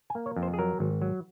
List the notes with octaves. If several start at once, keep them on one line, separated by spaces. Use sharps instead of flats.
G#5
A#3
C#5
F2
C5
G#4
F#3 A#4
G#1
F#3